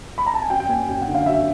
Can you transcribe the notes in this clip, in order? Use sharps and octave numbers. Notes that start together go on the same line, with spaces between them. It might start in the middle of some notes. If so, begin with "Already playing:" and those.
B5
A#5
A5
G#5
F#2 G5
G5
A#3 G#5
F#2 G5
F#5
D3
F5
F#3 E5